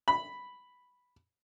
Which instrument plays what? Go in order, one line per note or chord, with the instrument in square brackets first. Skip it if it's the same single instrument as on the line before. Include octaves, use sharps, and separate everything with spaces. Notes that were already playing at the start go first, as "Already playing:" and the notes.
[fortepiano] B5